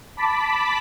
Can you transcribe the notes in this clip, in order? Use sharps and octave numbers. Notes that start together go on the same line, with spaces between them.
A5 B5 D6 B6